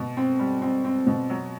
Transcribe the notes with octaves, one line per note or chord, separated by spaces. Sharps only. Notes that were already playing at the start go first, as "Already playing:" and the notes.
Already playing: B2
C4
G3
C4
C4
B2
F#3